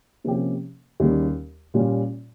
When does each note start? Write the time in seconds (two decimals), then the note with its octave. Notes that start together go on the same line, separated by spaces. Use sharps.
0.24 C3 F3 A#3 C#4 G4
1.00 D#2 C#3 G3
1.74 A#2 G3 C#4 F4